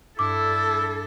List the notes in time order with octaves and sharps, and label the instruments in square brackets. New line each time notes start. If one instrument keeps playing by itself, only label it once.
[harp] G2 D4 E6 [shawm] E4 [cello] A4 [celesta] D6